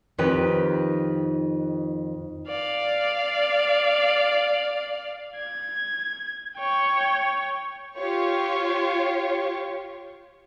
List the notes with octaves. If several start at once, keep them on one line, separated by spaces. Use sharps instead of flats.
F2 D#3 G4 B4
D5 F5
G#6
C#5 G5
F4 G4 C#5